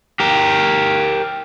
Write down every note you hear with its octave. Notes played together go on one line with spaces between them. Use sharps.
G4 A#4